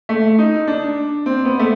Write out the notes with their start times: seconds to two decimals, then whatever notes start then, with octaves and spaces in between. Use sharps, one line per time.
0.09 A3
0.39 D#4
0.67 D4
1.26 C4
1.45 B3
1.59 A3